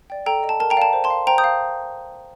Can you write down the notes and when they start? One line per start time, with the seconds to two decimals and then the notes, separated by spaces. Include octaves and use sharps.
0.10 D5 G5
0.26 A4 G5 A#5
0.43 D#5 G5
0.49 A5
0.60 A#4 A5
0.70 G5 A#5
0.77 D5 F5 A5
0.93 C5
1.04 A5 C6
1.10 F5
1.27 C5 G5 A#5
1.38 D#6 G6
1.44 F5